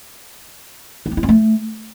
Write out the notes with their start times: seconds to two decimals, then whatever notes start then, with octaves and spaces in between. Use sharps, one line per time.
1.06 D#4
1.12 C4
1.17 E4
1.23 C#4
1.29 A3